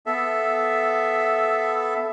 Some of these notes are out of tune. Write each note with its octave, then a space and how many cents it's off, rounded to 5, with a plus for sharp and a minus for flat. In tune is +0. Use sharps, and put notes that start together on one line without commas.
B3 +0 A4 -10 E5 +5